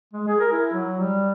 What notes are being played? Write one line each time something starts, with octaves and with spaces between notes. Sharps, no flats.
G#3
G#4
A#4
E4
F#3
G3